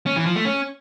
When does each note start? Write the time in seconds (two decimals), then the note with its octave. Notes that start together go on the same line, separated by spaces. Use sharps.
0.06 C#4
0.16 E3
0.26 F3
0.36 A3
0.45 C#4